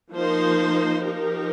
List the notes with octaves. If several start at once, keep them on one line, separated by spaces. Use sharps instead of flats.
F3 A#3 D#4 C5
F3 D#4 G4 A#4